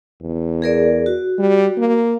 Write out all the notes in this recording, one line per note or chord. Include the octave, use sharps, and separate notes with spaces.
E2
G#4 A#4 D5
F#4
G3
A#3